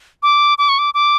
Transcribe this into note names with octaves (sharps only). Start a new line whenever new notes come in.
D6
D6
C#6
D6
D6